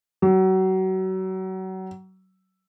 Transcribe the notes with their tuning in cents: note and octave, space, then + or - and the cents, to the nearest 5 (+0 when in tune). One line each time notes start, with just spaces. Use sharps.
F#3 +30